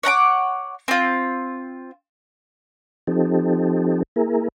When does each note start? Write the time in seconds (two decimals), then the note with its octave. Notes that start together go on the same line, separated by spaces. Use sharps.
0.03 C#5 F#5 A#5 D6
0.88 C4 F4
3.07 F3 C4 D#4 G4 A4
4.16 A#3 E4 G#4 A#4